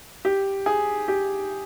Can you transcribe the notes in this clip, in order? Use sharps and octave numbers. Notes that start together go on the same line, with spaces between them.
G4
G#4
G4